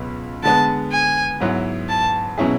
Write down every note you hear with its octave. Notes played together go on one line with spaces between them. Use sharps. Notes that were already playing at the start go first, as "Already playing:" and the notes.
Already playing: C#2 B2 F#3
D3 G#3 B3 A5
G#5
G#2 F#3 B3 E4 B4
A5
B2 F#3 C#4 E4 G#4